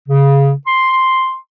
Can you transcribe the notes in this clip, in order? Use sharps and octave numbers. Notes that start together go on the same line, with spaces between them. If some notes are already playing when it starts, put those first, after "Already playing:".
C#3
C6